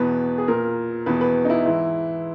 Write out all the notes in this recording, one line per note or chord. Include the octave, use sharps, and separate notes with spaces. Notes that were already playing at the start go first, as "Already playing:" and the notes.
Already playing: E2 B2 B4
G#4
A#2 A#4
E2 B2 B4
B4
D#4
E4
G#2 E3